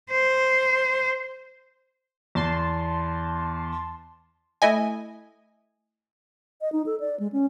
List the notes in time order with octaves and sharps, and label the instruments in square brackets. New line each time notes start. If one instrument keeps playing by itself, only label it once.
[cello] C5
[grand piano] E2 [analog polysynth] A5 C6
[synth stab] A3 E4 D#5 G#5
[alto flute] D#5
D#4
A4
D5
G#3
C#4